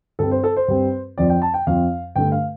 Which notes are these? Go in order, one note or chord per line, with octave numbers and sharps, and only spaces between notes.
G2 G3 C4 A4
C5
A4
C5
G2 G3 C4
F2 F3 C4 D5
G5
A5
G5
F2 F3 C4 F5
G2 D3 A3 G5
F5